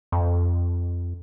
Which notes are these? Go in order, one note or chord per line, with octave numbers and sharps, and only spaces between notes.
F2